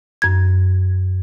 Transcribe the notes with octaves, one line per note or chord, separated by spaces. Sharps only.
F#2 G#6